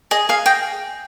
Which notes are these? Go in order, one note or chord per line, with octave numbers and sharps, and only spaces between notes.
G#4 D#5
G#4 F5
D#5 G5